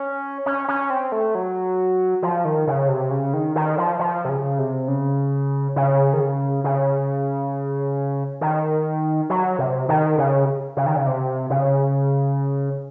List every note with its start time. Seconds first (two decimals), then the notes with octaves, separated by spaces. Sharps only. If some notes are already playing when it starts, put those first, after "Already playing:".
Already playing: C#4
0.46 C#4
0.68 C#4
0.90 C4
1.12 A3
1.35 F#3
2.23 F3
2.45 D#3
2.67 C#3
2.89 C3
3.11 C#3
3.34 D#3
3.56 D#3
3.78 F3
3.99 F3
4.25 C3
4.29 C#3
4.59 C3
4.88 C#3
5.76 C#3
6.13 D#3
6.20 C#3
6.64 C#3
8.41 D#3
9.30 F#3
9.59 C3
9.89 D#3
10.18 C#3
10.77 C#3
10.86 D#3
10.97 C#3
11.07 C3
11.50 C#3